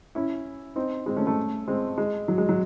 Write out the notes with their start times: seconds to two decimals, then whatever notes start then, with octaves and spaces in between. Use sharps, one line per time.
0.15 C#4 E4
0.76 C4 D#4
1.06 G#3 C4
1.17 A3 C#4
1.27 A3 C#4
1.68 G#3 C4
1.98 G#3
2.28 F#3
2.38 G#3
2.49 F#3